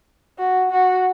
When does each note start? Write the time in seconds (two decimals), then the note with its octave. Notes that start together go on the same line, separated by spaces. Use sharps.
0.38 F#4
0.72 F#4